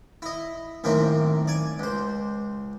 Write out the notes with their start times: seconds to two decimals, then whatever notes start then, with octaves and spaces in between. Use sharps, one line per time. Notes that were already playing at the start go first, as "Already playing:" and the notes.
0.22 E4 D#5
0.84 F#2 A2 D#3 A#3 C4
1.47 D5 G#5
1.79 C#2 C5